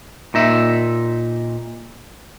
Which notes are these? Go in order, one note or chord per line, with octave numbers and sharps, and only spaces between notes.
A#2 D#4 E5